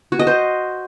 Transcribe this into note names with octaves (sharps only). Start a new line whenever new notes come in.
F#4
D#5
C5